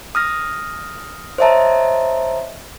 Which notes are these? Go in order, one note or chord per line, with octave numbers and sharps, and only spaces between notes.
D#6 F6 A#6
C5 C#5 D#5 E5 A5 A#5